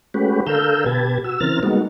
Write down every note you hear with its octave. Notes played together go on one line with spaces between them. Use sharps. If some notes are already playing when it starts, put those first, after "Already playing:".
G#3 A3 C#4 F#4 G4 B4
D3 A4 A#4 F5 E6 G6
B2 G4 B4 A5 G#6
F#4 E6
C#3 E3 C4 A#4 F6 A6
G3 G#3 A#3 B3 D#4 F#4